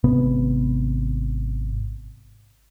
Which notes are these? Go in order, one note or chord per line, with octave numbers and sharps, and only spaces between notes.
G#1 C3 B3